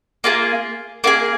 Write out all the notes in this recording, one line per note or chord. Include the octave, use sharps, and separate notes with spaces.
A#3 F4 G#4
A#3 F4 G#4